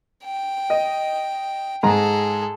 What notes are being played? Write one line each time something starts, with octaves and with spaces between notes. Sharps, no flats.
G5
D#5
G#2 G#4 A4 A#5